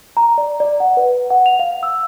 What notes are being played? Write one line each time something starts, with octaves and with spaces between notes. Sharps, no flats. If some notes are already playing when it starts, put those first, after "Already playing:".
A#5
D5
D5
F#5
B4
F#5
F7
F5
E6